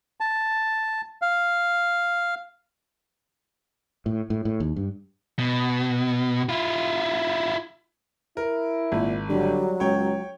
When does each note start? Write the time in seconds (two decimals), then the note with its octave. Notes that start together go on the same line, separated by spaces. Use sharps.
0.20 A5
1.22 F5
4.06 A2
4.30 A2
4.45 A2
4.60 D#2
4.76 G2
5.39 B2
6.49 E4 F4
8.37 E4 A#4
8.92 G#1 A#2
9.29 D3 F#3 G3
9.80 C#2 F#4 C#5 G5